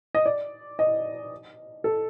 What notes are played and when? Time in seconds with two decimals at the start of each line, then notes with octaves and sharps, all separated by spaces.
0.15 D#5
0.26 D5
0.79 D#5
1.84 A4